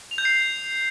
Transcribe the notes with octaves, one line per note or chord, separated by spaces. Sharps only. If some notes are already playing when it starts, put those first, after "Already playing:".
F7
G6
C7